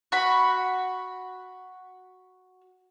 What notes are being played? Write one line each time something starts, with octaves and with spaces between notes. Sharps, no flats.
F#4 B5